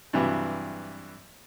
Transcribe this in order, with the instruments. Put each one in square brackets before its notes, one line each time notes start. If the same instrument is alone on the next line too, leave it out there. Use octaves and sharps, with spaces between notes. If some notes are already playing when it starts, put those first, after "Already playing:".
[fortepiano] G2 C3 E3 F#3